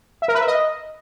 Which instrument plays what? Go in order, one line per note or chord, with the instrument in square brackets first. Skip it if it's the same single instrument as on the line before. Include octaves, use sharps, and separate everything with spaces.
[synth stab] E5
A#4
B4
E5
D#5